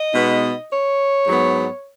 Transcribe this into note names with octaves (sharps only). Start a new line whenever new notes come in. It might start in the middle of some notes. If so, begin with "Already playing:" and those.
Already playing: D#5
B2 G#3 B3 D#4
C#5
G#2 F#3 B3